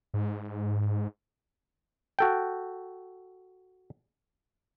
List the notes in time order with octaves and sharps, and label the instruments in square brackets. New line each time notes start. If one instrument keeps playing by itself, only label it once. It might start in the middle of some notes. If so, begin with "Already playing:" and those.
[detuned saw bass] G#2
[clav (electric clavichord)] F#4 A4 G5